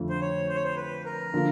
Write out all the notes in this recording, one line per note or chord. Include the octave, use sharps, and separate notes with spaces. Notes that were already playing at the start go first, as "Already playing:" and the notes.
Already playing: F2 D3 F3 A3
C5
C#5
C5
C#5
C5
B4
A#4
D3 F3 A#3